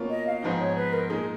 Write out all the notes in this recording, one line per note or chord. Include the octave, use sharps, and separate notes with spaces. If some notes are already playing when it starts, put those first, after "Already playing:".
Already playing: B2 A#3 C#4 F4
D#5
F5
G#2 F3 B3 D#4
C#5
B4
A#4
A#2 G#3 D#4 G#4